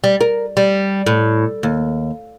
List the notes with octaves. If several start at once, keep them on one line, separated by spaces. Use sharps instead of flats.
G3
A#4
G3
A2
D#2